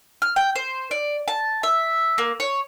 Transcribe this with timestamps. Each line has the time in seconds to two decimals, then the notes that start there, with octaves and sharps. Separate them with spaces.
0.22 F6
0.36 G5
0.55 C5
0.91 D5
1.28 A5
1.63 E5
2.18 A#3
2.40 C#5